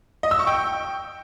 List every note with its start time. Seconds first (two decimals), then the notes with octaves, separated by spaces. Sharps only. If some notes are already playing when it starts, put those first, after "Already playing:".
0.23 D#5
0.31 E6
0.39 C#6
0.47 G5